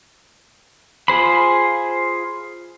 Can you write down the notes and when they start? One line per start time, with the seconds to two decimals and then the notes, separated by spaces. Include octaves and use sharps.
1.08 F4 G#4 C5 B5